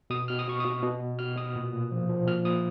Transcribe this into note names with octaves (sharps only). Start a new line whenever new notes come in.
B2 D#6
B2 F6
D#6
B2 C#6
B2 D#6
B2
B2
B2 F6
B2 D#6
A#2
A#2
F3
F3
A#2 F6
A#2 D#6